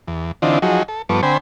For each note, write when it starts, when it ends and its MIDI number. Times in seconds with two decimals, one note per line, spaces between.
0.07 0.32 40
0.42 0.59 50
0.42 0.59 52
0.42 0.59 60
0.42 0.59 62
0.42 0.59 63
0.42 0.59 65
0.62 0.83 53
0.62 0.83 54
0.62 0.83 63
0.62 0.83 66
0.62 0.83 68
0.88 1.02 69
1.09 1.21 43
1.09 1.21 53
1.09 1.21 59
1.09 1.21 69
1.09 1.21 85
1.09 1.21 86
1.23 1.37 50
1.23 1.37 60
1.23 1.37 72
1.23 1.37 79
1.23 1.37 80
1.23 1.37 83